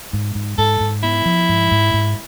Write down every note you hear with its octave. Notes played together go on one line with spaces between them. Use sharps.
G#2
G#2
G#2 A4
G#2
B3 E4
F3
G#2
G#2
G#2